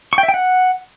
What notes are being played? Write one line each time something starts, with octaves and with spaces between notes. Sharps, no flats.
C#6
G5
E5
G5
F#5